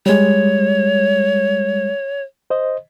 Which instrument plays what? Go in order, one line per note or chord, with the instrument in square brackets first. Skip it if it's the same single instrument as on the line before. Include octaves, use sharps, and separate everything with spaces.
[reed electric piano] G3 G#3 [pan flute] C#5
[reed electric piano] C5 D#5